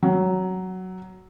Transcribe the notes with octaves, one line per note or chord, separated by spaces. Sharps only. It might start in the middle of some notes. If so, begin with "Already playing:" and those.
F#3